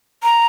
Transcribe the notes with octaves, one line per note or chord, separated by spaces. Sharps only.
A#5